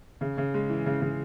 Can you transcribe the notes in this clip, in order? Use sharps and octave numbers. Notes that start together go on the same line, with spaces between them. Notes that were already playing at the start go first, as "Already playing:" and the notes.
C#3
C#3
G#3
E3
C#3
C#3